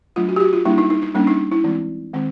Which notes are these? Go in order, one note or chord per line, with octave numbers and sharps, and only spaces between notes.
F#3 A3 D4 F4
F#4
G4
F#4
F4
G3 A#3 D4 E4
D#4
D#4
D#4
G3 A#3 C#4 D4
D#4
E4
E3 G#3 C4
D#3 G#3 C4